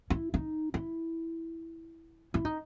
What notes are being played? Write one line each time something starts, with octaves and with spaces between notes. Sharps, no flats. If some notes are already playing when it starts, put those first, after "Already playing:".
E4
D#4
E4
E4
D#4